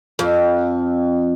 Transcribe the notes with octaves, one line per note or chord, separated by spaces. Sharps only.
F2